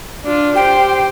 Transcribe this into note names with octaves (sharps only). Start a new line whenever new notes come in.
D4 F4
G4 C5 G5